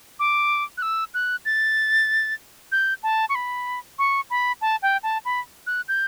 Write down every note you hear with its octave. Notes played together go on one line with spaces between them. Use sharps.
D6
F#6
E6
F#6
A6
G6
A5
C#6
B5
C#6
B5
A5
G5
A5
B5
F#6
G6